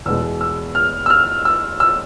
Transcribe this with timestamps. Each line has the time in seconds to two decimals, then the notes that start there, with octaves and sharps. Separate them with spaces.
0.06 E2 B2 G#3 E6
0.41 E6
0.75 F6
1.06 E6
1.10 F6
1.45 E6
1.80 E6